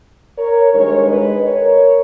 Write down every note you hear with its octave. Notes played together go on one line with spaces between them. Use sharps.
A#4 C#5
G2 D#3 G#3 A#4 C#5
B4 D#5
A#4 C#5